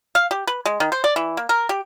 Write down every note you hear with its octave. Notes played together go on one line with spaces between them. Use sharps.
F5
G4
B4
G#3
D#3
C5
D5
E3
A#3
A#4
G4